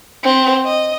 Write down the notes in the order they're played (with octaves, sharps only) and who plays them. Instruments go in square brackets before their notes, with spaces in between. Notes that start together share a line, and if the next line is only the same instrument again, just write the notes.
[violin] C4
D#5